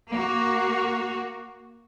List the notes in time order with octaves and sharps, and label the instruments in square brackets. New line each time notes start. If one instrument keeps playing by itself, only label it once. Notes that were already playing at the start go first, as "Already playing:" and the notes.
[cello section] A#3 F#4